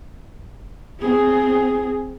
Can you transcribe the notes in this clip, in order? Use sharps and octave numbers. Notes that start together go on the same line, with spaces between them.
C4 G#4